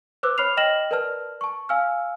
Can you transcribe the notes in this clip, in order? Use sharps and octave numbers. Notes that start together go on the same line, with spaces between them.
B4 C5 D6 E6 F#6
C#5 B5 F6 C7 F7
D#5 G5 F6 A#6 E7 F#7
A#4 B4 D5 A5 F6
A5 C#6
F5 G#5 E6 F6